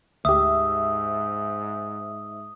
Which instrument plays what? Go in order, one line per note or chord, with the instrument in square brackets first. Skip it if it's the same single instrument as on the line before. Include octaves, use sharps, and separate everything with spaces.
[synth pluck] D2 G4 [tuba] G#2 [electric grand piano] E5 [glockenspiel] D#6